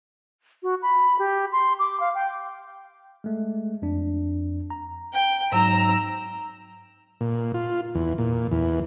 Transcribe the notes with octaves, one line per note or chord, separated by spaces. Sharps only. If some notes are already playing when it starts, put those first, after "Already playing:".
F#4
B5
G4
C6
D6
F5
G5
G#3 A3
F2 D4
A#5
G5
G#2 F#3 D#4 A#5 E6
A#2
F4
E2
A#2
E2